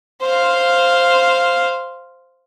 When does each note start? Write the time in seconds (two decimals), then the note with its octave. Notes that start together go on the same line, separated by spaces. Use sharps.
0.23 C5 F5